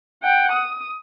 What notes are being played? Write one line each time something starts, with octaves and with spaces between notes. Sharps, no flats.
F#5 G5
D#6